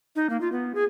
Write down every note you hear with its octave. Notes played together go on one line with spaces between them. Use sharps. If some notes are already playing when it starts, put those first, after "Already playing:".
D#4
A#3
F4
B3
G#4